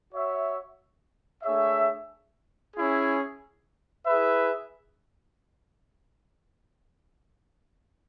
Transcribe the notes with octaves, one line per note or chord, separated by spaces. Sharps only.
F#4 C#5 E5
A3 D4 G#4 C#5 E5
C#4 E4 G#4
E4 G#4 B4 E5